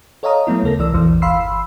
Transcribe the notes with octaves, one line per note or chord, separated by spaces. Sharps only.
A4 C#5 D#5 F5 A#5 D#6
F#3 A3 B3 E4
D#2 C#3 A4 A#4 A#6
C2 E3 D5 E6
A#1 E2 E3
G1 F5 B5 C6 E6 C7